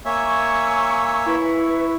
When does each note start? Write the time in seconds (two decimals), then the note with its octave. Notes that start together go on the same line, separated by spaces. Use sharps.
0.05 A#3 C#5 E5 G#5 C#6 E6
1.26 E4 B4 C#6